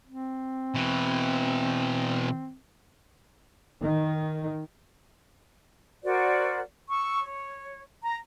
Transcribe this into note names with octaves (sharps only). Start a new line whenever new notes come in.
C4
B2 E3
D#3
F#4 A#4 C5 D5
C#6 E6
C#5
A#5